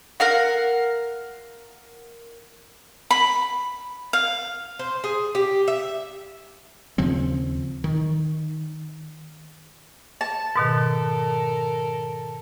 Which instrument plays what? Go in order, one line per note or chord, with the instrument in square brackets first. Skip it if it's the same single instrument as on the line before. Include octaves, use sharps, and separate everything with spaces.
[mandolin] A#4 F5 F#5
[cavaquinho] B5
F5
[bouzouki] C5
G#4
G4
E5
[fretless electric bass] D#2 C#3 F3 C4
D#3
[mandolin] A5
[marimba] G#2 B2 D#3 [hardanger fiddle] A4 A#4